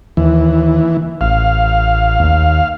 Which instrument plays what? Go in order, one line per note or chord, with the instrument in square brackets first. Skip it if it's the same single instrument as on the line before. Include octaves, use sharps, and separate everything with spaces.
[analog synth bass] D#2 [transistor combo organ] E3
[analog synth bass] A1 [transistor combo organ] F5
[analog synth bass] D#2